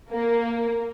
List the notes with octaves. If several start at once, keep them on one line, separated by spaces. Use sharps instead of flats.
A#3